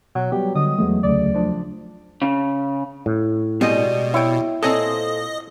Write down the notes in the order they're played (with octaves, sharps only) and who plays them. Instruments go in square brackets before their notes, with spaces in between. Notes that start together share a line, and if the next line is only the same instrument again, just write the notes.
[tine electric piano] B2 [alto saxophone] F#3
[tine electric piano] F#3 G3 B3 [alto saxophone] G4
[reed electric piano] D3 [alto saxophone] D#5
[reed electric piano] E2 F#3 A3 [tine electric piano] E3 G#3 B3
[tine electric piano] D2 C#3 [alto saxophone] D5
[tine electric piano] F3 D4 C5
[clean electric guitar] C#3
[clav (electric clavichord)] A2
[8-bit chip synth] B2 [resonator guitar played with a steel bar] G3 D#5 [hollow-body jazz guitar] G#3 C4
[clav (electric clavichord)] E4 [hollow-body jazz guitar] C#5 G5
[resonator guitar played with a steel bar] A#2 C4 C5 [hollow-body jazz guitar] A4 C#5 G#5 [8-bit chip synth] D#5